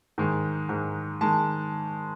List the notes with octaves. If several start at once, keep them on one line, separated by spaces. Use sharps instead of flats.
G#2 D#3 G#3
G#2 D#3 G#3
D#3 G#3 A5